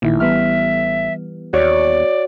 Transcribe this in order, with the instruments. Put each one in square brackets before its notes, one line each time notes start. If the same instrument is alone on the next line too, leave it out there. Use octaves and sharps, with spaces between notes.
[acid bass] A1 [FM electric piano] A#2 D#3 E4
[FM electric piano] E3 G3 B3 [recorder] E5 [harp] F6
[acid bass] D#2 [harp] F#4 C#5 [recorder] D5